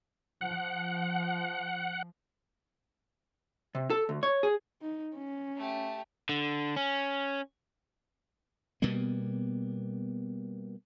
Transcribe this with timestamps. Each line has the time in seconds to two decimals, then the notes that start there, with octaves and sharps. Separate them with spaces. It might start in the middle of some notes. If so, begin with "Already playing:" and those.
0.41 F3 F#5
3.75 C3
3.90 A4
4.09 D2
4.23 C#5
4.43 G#4
4.82 D#4
5.15 C#4
5.56 A3 G4
6.29 D3
6.76 C#4
8.82 B2 G3 A#3 B3